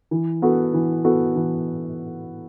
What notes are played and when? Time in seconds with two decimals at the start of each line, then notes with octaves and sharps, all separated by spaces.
0.11 E3
0.42 B3 F#4 A4
0.74 E3
1.05 B3 F#4 A4
1.36 E3